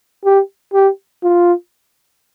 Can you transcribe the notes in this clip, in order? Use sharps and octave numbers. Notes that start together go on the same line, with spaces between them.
G4
G4
F4